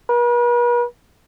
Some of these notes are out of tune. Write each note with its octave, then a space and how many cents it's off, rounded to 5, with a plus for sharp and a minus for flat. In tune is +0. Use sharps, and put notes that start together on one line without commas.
B4 -45